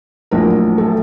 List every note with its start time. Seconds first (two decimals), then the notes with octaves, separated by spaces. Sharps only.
0.31 A#1 A2 F#3 A#4
0.78 A4